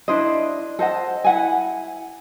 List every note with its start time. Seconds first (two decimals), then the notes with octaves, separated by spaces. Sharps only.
0.08 D4 E4 C5 D#5
0.79 A4 C5 D#5 F#5
1.24 E4 F#5 G#5